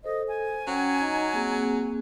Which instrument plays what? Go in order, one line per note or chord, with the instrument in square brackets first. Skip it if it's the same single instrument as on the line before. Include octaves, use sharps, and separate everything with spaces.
[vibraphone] A4 C5 [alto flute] D#5
[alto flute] G#5
[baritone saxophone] F#3 [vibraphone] C#4 F#5 G5
[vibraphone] D#4 D#5 A#5
A#3 C4 G#4